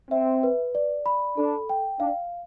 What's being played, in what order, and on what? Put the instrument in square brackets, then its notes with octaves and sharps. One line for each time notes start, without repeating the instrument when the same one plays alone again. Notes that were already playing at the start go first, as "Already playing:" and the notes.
[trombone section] C4 [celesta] E5
[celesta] B4
D5
B5
[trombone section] D4 [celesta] A4
[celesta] G5
[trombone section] D4 [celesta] F5